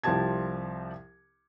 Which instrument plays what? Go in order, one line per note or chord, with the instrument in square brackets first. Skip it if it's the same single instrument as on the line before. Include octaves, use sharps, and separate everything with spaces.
[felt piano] C2 F3 C4 G4 A5 G#6